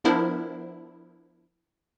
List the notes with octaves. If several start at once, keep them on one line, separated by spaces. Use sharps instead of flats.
F3 B3 D4 E4 A#4 C5